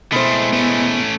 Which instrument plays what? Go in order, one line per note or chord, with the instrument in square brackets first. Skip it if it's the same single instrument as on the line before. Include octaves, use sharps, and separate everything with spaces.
[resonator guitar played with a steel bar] B2 C5 [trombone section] G#3 E4 [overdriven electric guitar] A3 C4
[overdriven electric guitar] A3 C#4 [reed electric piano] B3